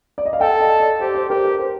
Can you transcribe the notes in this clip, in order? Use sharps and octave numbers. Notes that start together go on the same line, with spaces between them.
D5
D#5
F5
A4 G5
D#5
D5
G4 C5
C5
G4 A#4
A#4
C5